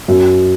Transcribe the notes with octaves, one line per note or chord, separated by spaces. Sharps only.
F#2